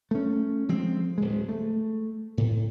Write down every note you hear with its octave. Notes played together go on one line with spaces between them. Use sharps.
A3 C#4
F3 G#3 C4
D1 G#3
A3
A2